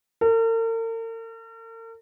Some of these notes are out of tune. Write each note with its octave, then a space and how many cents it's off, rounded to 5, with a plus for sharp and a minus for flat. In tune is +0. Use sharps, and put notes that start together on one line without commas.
A#4 -45